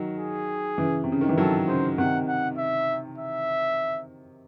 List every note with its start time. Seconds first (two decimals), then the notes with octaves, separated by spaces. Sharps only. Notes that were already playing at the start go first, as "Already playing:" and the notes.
Already playing: D#3 F#3
0.17 G#4
0.78 C#3 E3
1.04 C3
1.12 C#3
1.21 D#3
1.29 E3
1.37 D#3 F#3 A4
1.68 C#3 C5
1.98 C3 D#3 F#5
2.28 F#5
2.58 E5
3.18 E5